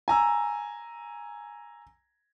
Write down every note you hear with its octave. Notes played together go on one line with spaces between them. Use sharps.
G#5 A#5 E6